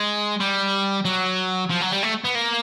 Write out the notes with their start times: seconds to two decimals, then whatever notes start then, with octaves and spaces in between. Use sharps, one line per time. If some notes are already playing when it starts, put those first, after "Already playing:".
Already playing: G#3
0.40 G3
1.05 F#3
1.70 F3
1.82 F#3
1.92 G3
2.03 A3
2.24 B3
2.35 A#3